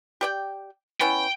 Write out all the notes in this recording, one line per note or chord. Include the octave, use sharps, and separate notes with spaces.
G4 D5 G5
B3 C#4 E4 G5